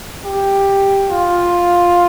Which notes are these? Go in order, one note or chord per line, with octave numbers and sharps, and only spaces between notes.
G4
F4